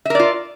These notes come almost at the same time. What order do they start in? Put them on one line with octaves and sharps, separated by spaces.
E5 A#4 D5 F4